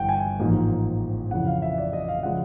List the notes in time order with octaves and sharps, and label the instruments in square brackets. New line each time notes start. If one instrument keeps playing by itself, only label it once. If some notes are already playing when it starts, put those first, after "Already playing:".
Already playing: [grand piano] G1 G2 E3 F#5 G5
G#5
A1 G#2 F3 A#3
F2 C#3 E3 F#5
F5
E5
D5
D#5
F5
C#3 F3 G#3 F#5